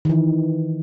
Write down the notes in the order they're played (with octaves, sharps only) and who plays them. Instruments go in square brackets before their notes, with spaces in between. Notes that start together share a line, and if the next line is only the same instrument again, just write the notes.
[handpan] D#3 E3